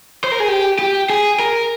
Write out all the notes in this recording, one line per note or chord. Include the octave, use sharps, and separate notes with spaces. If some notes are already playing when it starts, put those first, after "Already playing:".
C5
A#4
G#4
G4
G4
G#4
A#4